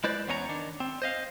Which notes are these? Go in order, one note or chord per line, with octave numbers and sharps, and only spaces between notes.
G#3 E4 B4 C5 D5
E2 B3 C#4 C#5 D#5 A#5
D#3 D4
C4
C5 D#5 F5